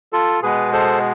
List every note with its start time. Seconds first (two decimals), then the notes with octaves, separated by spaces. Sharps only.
0.13 F4 A4
0.42 B2 G#3 B3 G#4 B4
0.73 A4 C5